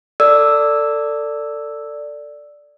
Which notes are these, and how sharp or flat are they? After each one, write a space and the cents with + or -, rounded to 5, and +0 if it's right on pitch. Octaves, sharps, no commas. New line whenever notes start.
A4 +25 D5 +0 E6 +0